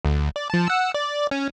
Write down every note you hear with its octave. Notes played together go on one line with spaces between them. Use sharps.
D2
D5
F3 A5
F#5 E6
D5
C#4